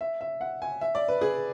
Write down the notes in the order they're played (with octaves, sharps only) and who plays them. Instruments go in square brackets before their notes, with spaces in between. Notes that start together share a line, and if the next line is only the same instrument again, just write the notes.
[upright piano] E5
E5
F#5
G#5
E5
D5
B4
G#4